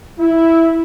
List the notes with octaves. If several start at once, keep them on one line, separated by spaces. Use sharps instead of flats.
E4